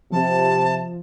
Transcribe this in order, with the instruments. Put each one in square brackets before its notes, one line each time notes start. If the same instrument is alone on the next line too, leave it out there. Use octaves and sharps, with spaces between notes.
[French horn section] C3 [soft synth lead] F3 [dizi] A5